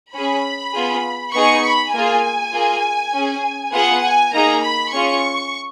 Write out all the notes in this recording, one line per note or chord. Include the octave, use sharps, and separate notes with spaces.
C#4 G#4 B5
B3 F4 G#4
B3 D#4 G#4 C#6
B5
A#3 F4 G#4 G#5
A#3 F4 G#4
C#4 G#4
B3 F4 G#4 F#5
G#5
A#3 D#4 G#4 A#5
B5
C#4 F4 G#4 C#6